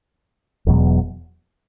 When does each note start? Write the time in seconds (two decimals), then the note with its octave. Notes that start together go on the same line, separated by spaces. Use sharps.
0.67 E1 E2 B2 F#3